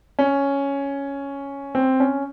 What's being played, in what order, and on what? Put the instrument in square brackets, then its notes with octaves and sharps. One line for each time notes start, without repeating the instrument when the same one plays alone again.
[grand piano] C#4
C4
C#4